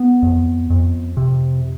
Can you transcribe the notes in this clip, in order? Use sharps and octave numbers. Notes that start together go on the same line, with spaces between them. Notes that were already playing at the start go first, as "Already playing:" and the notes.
Already playing: B3
F2
F2
C3